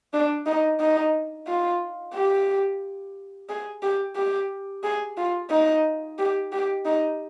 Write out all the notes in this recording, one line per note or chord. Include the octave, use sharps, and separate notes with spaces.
D4
D#4
D#4
F4
G4
G#4
G4
G4
G#4
F4
D#4
G4
G4
D#4